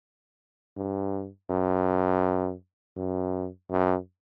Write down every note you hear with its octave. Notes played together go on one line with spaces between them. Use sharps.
G2
F#2
F#2
F#2